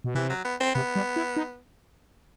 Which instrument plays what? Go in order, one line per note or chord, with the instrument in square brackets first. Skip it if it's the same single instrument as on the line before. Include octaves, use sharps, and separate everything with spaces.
[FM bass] B2
[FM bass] C3 [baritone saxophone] E3
[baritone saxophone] F#3
B3
C4
[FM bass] C3 [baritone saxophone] B3
[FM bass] G3
E4
D#4